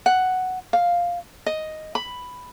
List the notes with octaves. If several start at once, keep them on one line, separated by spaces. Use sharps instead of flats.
F#5
F5
D#5
B5